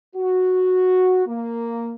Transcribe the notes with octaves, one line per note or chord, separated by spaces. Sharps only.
F#4
A#3